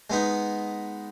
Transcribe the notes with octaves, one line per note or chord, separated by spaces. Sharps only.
G#3 B3 D#4